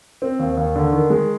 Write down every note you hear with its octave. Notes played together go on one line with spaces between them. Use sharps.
C4
D#2
D#2
D3
D#3
G#3